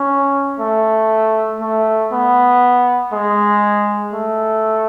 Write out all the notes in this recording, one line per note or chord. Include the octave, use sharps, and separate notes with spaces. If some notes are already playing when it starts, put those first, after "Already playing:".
Already playing: C#4
A3
A3
B3
G#3
A3